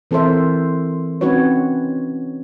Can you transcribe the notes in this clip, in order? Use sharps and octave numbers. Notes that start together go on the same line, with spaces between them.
E3 C4 A4 A#4 C5 E5
C4 C#4 D#4 F#4 B4 C#5